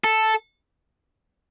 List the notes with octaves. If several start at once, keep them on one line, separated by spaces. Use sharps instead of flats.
A4